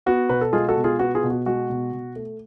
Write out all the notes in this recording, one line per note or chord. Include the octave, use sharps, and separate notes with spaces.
B3 F#4
B2 B4
A4
G#3 F4 G#4
F#4 A4
B2
F4 G#4
B3 F#4
F4 G#4
B2
F#4
G#3 F#4
B2
B2
A3